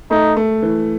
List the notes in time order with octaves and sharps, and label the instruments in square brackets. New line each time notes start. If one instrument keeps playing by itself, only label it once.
[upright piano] A3 [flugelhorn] D#4
[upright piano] A3
E3